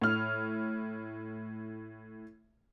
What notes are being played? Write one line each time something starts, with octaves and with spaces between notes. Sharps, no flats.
A2 F6